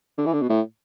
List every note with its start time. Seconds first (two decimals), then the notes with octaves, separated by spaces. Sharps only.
0.18 D3
0.26 E3
0.33 D3
0.41 B2
0.49 A2